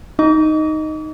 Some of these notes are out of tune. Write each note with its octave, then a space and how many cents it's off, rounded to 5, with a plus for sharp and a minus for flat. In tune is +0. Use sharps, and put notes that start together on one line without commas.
D#4 +0 D#5 +0 D6 -45